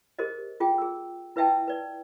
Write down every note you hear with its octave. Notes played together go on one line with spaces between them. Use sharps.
G4 G#4 A#4 C5 D#5
F4 G#4 G5
G#4 E6
E4 B4 D#5 E5 G5 A5
B4 D5